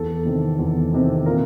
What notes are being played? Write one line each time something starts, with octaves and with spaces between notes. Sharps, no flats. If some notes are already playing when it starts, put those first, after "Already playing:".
Already playing: E2 A4
C3 D#3
E2
C3 D#3
A#2 A#4